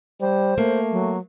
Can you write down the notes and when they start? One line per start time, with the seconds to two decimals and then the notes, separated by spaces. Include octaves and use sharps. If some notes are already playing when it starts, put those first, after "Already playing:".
0.21 G3 C5
0.58 A3 A#3
0.92 F#3